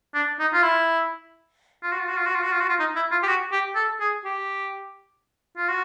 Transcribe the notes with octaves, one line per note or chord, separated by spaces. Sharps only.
D4
D#4
F4
E4
F4
F#4
F4
F#4
F4
F#4
F4
F#4
F4
F#4
F4
D#4
E4
F4
G4
F#4
G4
A4
G#4
G4
F4
F#4